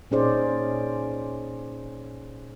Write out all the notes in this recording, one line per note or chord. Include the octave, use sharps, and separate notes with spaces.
A#2 C#4 D#4 G#4 C5 D5